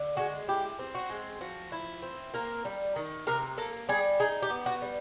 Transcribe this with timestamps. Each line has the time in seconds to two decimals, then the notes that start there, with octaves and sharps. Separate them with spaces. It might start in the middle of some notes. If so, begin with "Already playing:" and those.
Already playing: D3
0.17 G#3 F#4
0.48 E4 G4
0.79 C4
0.95 F#4
1.10 G#3
1.41 F3 F#4
1.72 E4
2.03 C4
2.34 A#3 A#4
2.65 G3
2.96 D#3
3.27 C3 A#4
3.58 A#3 A4
3.89 G3 G#4
4.20 D#4 G#4
4.42 G4
4.50 B3
4.66 F#4
4.82 G3